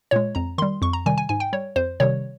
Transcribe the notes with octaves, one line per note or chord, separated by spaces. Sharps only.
A#2 G#3 C#5
F2 A#5
D#3 G3 C6
F2 C#6
A#5
C3 D#3 G3 G#5
G#5
G#2 G#5
G5
G3 C#5
F2 C5
C3 D#3 G3 C#5